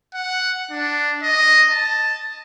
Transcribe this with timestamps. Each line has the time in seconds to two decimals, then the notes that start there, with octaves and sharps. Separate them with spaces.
0.14 F#5
0.71 D4
1.22 D#5
1.70 A5